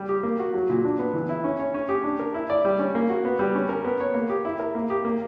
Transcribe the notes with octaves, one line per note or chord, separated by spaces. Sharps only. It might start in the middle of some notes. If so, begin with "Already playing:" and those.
Already playing: G3
G4
A#3
F#4
F#3
A#2
D4
B3
E3
E4
C#4
C#5
C#4
G4
D4
A#4
E4
D5
G3
C#4
A#3
F#4
B3
G3
C#4
A#4
B3
C#5
A#3
G4
E4
A#4
A#3
G4
A#3